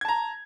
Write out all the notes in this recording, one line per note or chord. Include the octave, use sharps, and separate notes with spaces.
A5 A#5 G#6